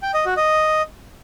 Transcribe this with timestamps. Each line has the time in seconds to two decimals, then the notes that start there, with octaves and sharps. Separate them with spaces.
0.02 G5
0.14 D#5
0.25 F#4
0.37 D#5